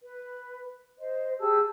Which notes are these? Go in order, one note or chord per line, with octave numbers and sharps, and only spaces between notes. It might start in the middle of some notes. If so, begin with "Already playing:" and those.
B4
C5 D#5
G4 G#4 A5 E6